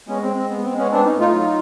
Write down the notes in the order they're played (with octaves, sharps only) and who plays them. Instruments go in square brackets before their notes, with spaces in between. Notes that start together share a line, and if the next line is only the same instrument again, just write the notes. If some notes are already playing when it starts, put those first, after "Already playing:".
[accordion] G#3 B3 C#4
C4
G#3
C4
B3
C4
G#3
B3 C#4
B3 C4 D4
C#4 D#4
A2
D#4 F4
F#3